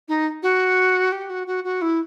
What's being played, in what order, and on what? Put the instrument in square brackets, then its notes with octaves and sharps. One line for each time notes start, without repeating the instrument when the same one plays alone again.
[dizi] D#4
F#4
G4
F#4
F#4
F#4
E4